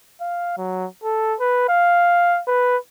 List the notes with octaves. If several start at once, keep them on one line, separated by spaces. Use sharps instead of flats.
F5
F#3
A4
B4
F5
B4